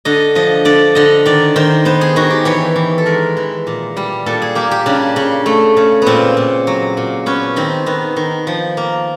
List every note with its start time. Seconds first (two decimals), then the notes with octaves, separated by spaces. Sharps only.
0.05 D3 D#5
0.35 F3 D#5
0.65 D3 D5
0.95 D3 D#5
1.26 D#3 D5
1.56 D#3 C5
1.85 B3 C5
2.01 G#4
2.16 D#3 F#4
2.30 G4
2.45 E3 C#5
2.76 E3
2.98 A4
3.06 G#3 A#4
3.37 E3
3.67 A#2
3.97 G3
4.26 A#2 A4
4.42 G#4
4.55 A#3 G4
4.71 G4
4.86 C#3 D4
5.16 C#3
5.46 A3
5.77 C#3
6.02 A#2 B3 C4
6.37 A#2
6.67 F#3
6.97 A#2
7.26 B3 C#4
7.56 D#3 C4
7.86 D#3 B3
8.16 D#3
8.47 F3
8.77 A#3